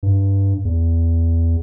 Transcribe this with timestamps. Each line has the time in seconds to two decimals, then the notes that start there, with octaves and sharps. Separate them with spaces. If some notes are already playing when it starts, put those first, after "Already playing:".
0.03 G2
0.65 E2